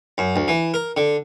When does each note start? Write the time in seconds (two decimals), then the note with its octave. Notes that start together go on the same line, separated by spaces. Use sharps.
0.18 F#2
0.36 D2
0.48 E3
0.74 A#4
0.97 D3